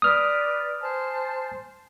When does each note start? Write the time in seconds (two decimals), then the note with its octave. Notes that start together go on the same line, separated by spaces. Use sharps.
0.02 B4 D5 D#6 F6
0.82 C5 G#5 A5